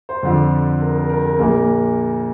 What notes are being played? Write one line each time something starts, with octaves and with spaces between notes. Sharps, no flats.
C5
F2 D3 F3
A#4
A#4
A#4
A#4
A#1 A#2 A#3 A#4